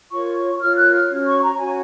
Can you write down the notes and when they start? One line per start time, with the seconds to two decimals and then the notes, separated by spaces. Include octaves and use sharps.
0.12 F4 A#4 C#5 C#6
0.61 F4 A#4 C#5 F6
0.77 F#6
0.94 F6
1.10 C#4 F#4 C#5
1.26 C#6
1.43 A#5
1.59 C#4 F#4 C#5 G#5